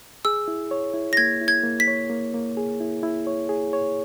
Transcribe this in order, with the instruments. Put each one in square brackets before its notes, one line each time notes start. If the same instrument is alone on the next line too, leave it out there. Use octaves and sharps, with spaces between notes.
[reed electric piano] G#4 [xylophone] E6
[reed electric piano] E4
C#5
E4
[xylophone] A#6
[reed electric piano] A#3 [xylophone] G#6
[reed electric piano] E4
[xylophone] G#6
[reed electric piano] A#3
[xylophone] B6
[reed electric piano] C#5
A#3
A#3
G#4
E4
E4
C#5
G#4
C#5